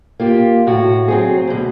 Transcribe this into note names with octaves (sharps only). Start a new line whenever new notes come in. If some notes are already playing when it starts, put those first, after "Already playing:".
A#3 F4 G4
A2 F#4
F#3 C4 G#4
D2 B2